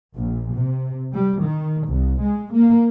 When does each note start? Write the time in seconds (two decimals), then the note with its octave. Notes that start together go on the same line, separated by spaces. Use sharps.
0.17 A#1
0.55 C3
1.13 G3
1.41 D#3
1.88 C2
2.20 G#3
2.53 A#3